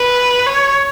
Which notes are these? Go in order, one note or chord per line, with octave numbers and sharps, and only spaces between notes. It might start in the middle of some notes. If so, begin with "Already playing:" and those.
Already playing: B4
C#5